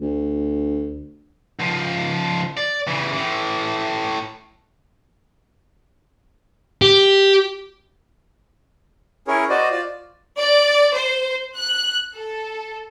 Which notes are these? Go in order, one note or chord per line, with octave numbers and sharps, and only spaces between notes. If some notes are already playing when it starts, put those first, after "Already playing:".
D2
C#2 F3
D5
C#3 E3
A2 E3
G4
C#4 E4 G#4 A#4 C#5
F#4 C5 D5 D#5
F4 D5
D5
C5
F#6
A4